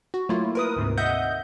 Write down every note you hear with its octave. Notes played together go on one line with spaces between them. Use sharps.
F#4
F#3 A3 A#3 E4 F4
A#4 B4 D#6
D2 G#2 C3
D#5 E5 F#5 D#6 G6